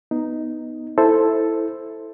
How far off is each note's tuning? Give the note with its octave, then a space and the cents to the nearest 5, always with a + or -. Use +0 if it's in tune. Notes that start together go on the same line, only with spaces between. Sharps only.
B3 +0 D#4 +0
E4 +0 A4 +0 C5 +0